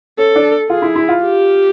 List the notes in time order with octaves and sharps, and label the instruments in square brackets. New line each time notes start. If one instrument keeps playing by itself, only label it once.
[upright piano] C#4 [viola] A4
[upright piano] D4
[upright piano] F4 [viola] G#4
[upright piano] E4
E4
F4
[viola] G4